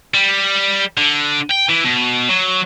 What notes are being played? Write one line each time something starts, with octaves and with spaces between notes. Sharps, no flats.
G3
D3
G5
E3
B2
F#3